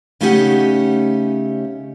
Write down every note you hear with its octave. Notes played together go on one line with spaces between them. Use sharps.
C#3 A3 C#4 D#4 G4 F#5